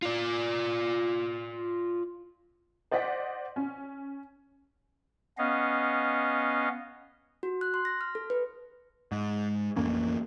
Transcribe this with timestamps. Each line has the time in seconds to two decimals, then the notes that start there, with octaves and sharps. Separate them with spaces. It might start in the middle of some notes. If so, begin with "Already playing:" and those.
0.03 F4 D5
2.91 C5 D5 D#5 F#5 B6
3.56 C#4
5.38 B3 C#4 D#5 F5
7.43 F#4
7.61 F#6
7.74 C6
7.85 A#6
8.01 F6
8.15 A4
8.30 B4
9.12 G#2
9.76 A1 F2 A#3 C#4